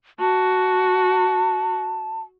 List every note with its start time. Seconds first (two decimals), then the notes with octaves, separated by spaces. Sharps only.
0.20 F#4 A5